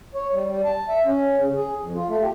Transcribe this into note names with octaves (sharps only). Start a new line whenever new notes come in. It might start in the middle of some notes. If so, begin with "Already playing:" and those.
C#5
G3
G3
A5
E5
C#4
C#3
G#4
F2
F4
A3
G4